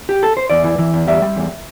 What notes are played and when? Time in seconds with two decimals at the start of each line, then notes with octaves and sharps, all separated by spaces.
0.09 G4
0.23 A4
0.37 C5
0.50 E2 D5
0.64 E3
0.78 E3
0.94 E2
1.07 G3 E5
1.22 G3
1.36 E2